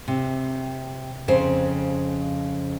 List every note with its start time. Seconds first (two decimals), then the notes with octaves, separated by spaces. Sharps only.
0.08 C3
1.28 F2 C#3 C5